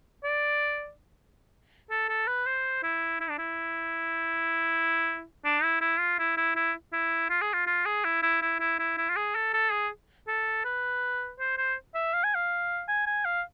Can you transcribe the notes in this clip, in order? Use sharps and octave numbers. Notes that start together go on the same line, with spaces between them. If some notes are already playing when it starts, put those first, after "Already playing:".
D5
A4
A4
B4
C5
E4
E4
D4
E4
D4
E4
E4
F4
E4
E4
E4
E4
F4
G#4
F4
F4
G#4
E4
E4
E4
E4
E4
E4
F4
G#4
A4
A4
G#4
A4
B4
C5
C5
E5
F5
G#5
F5
G#5
G#5
F5